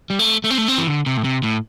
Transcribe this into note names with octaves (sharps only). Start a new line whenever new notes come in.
G3
A3
A3
C4
A3
C4
E3
D3
C3
A2
C3
A2